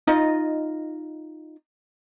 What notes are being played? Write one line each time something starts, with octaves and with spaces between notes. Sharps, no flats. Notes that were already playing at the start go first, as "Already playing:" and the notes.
D#4 F4 D#5